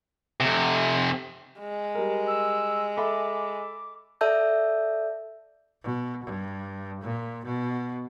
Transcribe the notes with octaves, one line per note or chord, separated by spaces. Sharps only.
F2 C3
G#3
G3 A#4
E6
A4 E5 B5 D6
A4 D5 E5 A5 E6 G6
B2
G2
A#2
B2